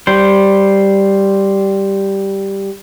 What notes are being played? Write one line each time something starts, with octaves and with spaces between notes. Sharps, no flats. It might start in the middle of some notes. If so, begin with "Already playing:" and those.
G3 C5